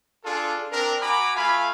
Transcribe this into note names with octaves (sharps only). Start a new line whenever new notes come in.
D4 F4 G#4 A4
C4 D4 A#4
F#4 G#5 A#5 B5 D6
A3 F4 F5 G#5 B5